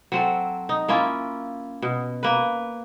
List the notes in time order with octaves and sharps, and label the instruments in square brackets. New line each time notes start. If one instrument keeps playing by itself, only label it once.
[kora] F#3 C4 A4
D#4
A#3 C#4 E4 F4
B2
A#3 B4